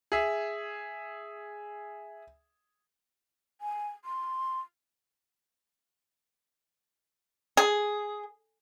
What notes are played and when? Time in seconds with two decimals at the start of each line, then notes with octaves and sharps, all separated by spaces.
0.12 G#4 E5
3.61 G#5
4.05 C6
7.57 G#4